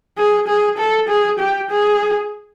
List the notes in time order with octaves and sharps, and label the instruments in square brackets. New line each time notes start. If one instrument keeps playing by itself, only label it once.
[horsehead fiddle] G#4
G#4
A4
G#4
G4
G#4